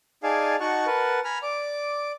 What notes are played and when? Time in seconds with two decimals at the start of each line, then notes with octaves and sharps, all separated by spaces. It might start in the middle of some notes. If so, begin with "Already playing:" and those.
0.23 D#4 G#4 D5 F5 G#5 A5
0.60 D#4 F#4 F#5 A5 C#6
0.87 A#4 B4 F#5 A5
1.24 G#5 A#5 B5 F6
1.43 D5 D6